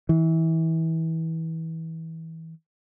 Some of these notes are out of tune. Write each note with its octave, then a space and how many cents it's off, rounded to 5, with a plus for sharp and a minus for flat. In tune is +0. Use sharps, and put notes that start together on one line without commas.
E3 -25